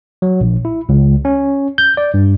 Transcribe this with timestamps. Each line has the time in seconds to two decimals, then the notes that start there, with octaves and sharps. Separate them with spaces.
0.22 F#3
0.41 A#1
0.65 E4
0.89 C#2
1.25 C#4
1.78 G6
1.97 D5
2.14 G2